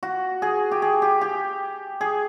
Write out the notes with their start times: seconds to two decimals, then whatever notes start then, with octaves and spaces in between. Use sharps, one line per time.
0.03 F#4
0.42 G#4
0.71 G4
0.82 G#4
1.02 G4
1.21 G4
2.01 G#4